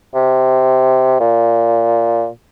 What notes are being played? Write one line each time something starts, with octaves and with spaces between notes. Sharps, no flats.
C3
A#2